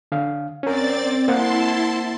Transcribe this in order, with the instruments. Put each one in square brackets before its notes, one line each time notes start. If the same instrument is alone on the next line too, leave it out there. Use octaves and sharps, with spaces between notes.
[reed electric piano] D3 F5
[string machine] C4 D5 A6 [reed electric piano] C#4 A#4
[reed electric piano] A#3 C5 F#5 [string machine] E4 A5 C6